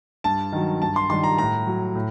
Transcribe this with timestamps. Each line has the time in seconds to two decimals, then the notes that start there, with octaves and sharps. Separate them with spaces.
0.24 G2 A5
0.52 D#3 F#3
0.82 G2 A5
0.96 C6
1.10 D#3 G3 C6
1.24 A#5
1.38 A2 A#5
1.67 F#3
1.95 A2